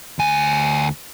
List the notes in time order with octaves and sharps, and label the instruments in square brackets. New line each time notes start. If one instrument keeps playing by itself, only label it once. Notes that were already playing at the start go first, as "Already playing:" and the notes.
[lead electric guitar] D2 G#5